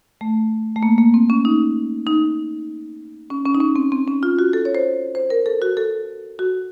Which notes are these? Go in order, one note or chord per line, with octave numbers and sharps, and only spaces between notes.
A3
A3
A#3
A#3
C4
C#4
D#4
D#4
C#4
C#4
D#4
C#4
C4
C4
C#4
F4
F#4
A4
C#5
C5
C5
A#4
A4
F#4
A4
F#4